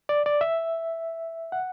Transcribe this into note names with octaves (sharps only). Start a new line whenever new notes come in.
D5
D5
E5
F#5